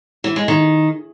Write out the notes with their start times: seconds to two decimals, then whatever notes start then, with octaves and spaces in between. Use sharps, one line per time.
0.24 E3
0.36 G#3
0.48 D#3